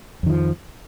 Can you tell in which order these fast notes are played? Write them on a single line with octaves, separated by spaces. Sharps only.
F2 D#3 F3